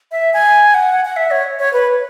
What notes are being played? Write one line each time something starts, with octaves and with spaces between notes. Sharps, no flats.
E5
G#5
F#5
F#5
E5
C#5
C#5
B4